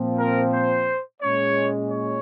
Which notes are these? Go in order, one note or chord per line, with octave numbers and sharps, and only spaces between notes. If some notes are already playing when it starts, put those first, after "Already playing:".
Already playing: A#2 F3 C4
A#4
C5
A#2 G#3 C#4 C#5
C#5